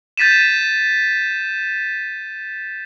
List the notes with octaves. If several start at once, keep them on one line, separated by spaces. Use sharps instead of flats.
G6 A6 B6 D#7 E7